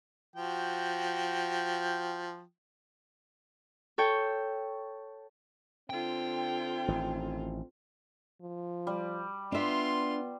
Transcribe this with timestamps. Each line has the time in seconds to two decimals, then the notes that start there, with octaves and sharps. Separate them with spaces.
0.36 F3 F#4 G5
3.98 A4 C#5 G5
5.90 D3 C4 F4 G5
6.88 A1 D#3
8.41 F3
8.87 G3
9.52 B3 D4 F4 E5 C6